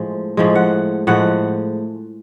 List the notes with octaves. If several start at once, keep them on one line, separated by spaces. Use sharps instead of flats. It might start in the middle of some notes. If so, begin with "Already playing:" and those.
Already playing: A2 F3 G#3
A2 F3 G#3
F#5
A2 F3 G#3 F#5